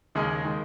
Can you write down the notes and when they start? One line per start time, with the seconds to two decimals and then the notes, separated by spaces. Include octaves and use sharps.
0.15 D#2 C#3 G#3 D#4 G#4
0.45 D#3 G#3